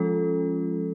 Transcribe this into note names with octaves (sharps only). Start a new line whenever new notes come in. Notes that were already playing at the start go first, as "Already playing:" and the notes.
Already playing: F3 G#3 C#4 F4 A4